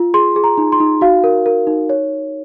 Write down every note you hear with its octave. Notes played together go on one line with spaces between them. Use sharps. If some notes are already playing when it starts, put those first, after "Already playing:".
Already playing: F4
G#4 C6
G#4
A#5
D#4
C6
D#4
F#4 F5
A#4
A#4
D#4
C#5